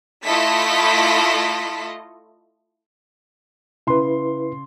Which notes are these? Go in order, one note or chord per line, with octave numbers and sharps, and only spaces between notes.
A3 E4 F4 A4 D#5 B6
C#3 E4 B4 C6